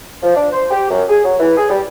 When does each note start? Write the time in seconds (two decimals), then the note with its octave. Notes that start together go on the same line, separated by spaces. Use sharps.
0.23 F3
0.36 D4
0.52 C5
0.71 G4
0.90 F#2
1.09 G#4
1.24 F#3
1.40 E3
1.58 G#4
1.70 G3